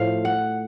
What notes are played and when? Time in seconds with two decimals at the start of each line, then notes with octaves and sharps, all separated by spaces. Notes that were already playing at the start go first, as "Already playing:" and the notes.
Already playing: A2 F3 F5
0.25 F#5